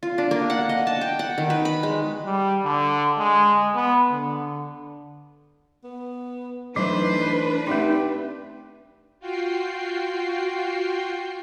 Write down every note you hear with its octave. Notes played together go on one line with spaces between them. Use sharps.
F4
D4
A#3
F#5
D#5
A5
G5
F#5
D#3
B4
B5
G#3
G3
D3
G#3
B3
D3
B3
E3 F#3 A3 D4 D#4 B4 C5
A3 C4 D#4 G4 D5 E5
F4 F#4 G5 C7